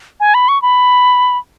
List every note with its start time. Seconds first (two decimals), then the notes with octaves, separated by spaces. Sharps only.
0.20 G#5
0.34 B5
0.48 C#6
0.62 B5